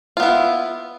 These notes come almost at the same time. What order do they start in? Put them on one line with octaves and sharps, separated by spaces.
F4 B3 E4